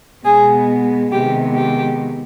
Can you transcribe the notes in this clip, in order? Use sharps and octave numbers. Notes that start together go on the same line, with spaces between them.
B2 G#3 B3 G#4
C3 D#3 G#3 B3 G4
G4